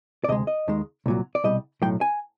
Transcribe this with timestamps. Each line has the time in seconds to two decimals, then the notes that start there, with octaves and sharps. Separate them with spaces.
0.24 D5
0.28 D2 C3 G#3 D#5
0.47 D#5
0.68 D#2 D#3 G#3
1.06 C2 A#2 F#3
1.35 D5
1.44 C2 B2 G3 D#5
1.82 B1 A2 F#3 G5
2.01 G#5